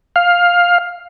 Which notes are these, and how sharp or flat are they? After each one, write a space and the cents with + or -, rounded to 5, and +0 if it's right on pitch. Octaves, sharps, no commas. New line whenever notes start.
F5 +10